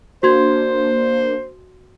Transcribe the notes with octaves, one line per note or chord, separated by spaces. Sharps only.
A#3 D4 F#4 C5 C6 G#6